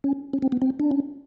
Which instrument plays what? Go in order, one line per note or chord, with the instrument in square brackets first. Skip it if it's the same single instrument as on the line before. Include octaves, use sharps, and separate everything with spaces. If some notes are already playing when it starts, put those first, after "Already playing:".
[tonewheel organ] C#4
C#4
C4
B3
C4
D4
C#4